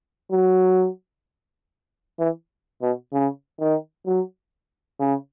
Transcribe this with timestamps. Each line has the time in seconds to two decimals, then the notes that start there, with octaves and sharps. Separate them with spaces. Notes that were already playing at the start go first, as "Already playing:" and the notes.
0.32 F#3
2.19 E3
2.82 B2
3.13 C#3
3.60 D#3
4.06 F#3
5.00 C#3